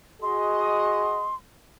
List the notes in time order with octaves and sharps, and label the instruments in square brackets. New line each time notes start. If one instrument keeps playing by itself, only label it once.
[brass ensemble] F#4 G#4 D#5 [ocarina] C6